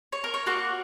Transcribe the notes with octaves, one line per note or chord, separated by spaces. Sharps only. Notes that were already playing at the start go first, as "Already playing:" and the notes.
C#5
A#4
C#5
A#3 F#4 C#6